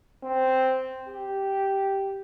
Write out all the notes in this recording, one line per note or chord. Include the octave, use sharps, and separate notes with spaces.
C4
G4